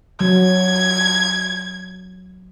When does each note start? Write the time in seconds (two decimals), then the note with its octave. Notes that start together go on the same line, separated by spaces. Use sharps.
0.21 F#3 G#6